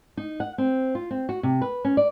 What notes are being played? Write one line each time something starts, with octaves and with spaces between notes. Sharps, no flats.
D#4
F#5
C4
F4
C4
F#4
C3
B4
C#4
D5